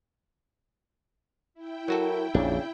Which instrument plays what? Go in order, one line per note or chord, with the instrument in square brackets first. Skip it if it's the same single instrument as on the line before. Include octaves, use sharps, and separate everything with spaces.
[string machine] E4 G5
[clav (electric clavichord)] F#3 F#4 A4 [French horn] A#4
[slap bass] A#1 F2 [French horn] C#3 [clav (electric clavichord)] D4